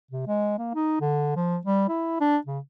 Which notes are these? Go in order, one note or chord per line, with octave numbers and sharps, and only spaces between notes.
C3
G#3
A#3
D#4
D3
F3
G3
E4
D4
C#3